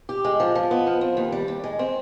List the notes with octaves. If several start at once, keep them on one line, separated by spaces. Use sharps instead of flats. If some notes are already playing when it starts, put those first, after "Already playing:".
G4
G#3
F3
F3
B3
F3
C4
D#2
G3
D#2
G#3
C4